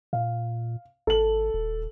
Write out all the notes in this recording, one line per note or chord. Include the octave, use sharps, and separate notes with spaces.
A#2 F5
G#1 A4 F#7
D#1